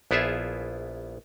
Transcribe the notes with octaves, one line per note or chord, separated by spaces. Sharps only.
A#1 B3 E4 F4 G#4 E5